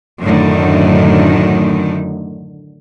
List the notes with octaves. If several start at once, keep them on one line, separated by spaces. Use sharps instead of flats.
F#2 A2 D3 D#3